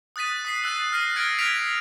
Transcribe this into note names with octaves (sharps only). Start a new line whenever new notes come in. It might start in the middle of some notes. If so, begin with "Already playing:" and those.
D#6 F#6 A6 B6 D#7
D#6 B6 C7
E6 F#6 A6 D#7
F6 A#6 C7 D#7
F6 G#6 A#6 C#7 D7
F6 G#6 A#6 B6 D7 F7